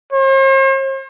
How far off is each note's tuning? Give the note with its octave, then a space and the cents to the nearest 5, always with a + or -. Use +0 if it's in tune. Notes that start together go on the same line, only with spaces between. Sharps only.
C5 +45